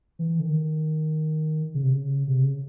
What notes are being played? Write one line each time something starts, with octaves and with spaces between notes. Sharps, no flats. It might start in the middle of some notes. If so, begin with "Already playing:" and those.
E3
D3
D#3
C#3
C3
C#3
C3
C#3